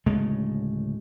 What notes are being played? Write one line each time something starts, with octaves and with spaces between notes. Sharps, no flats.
D1 C#3 G#3 A3